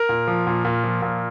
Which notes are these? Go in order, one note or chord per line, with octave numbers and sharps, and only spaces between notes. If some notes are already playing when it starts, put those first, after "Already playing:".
Already playing: A#4
A#2
F3
A#2
A#2
F3
A#2